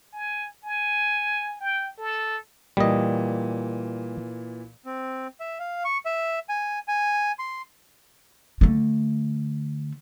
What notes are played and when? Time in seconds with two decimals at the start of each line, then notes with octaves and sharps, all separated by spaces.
0.13 G#5
0.64 G#5
1.60 G5
1.98 A4
2.77 A#2 E3 G3 D#5
4.85 C4
5.40 E5
5.59 F5
5.85 C#6
6.06 E5
6.49 G#5
6.88 G#5
7.39 C6
8.61 D3 A3